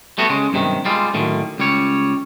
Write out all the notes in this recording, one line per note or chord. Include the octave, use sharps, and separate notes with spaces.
G3 A3 B3 F#4
C#3 G#3
B1 G2 C3 D#3
G3 G#3 F4
A2 D3 D#3 F#3
C#2 G3 C#5